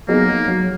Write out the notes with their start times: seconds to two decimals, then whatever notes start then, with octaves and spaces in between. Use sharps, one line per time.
0.08 F#3 A#3 B3 D#4 G#4
0.48 F#3